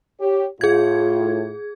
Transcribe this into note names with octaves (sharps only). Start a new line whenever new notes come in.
G4 C#5
A2 F4 G#4 G#6